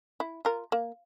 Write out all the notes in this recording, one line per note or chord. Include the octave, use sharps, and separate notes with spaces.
E4
F4 A#4
A#3